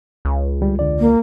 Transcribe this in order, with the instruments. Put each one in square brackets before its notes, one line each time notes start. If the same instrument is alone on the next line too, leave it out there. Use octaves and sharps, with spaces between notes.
[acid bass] C#2
[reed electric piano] D2 G3
E2 D3 D5
[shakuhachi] A#3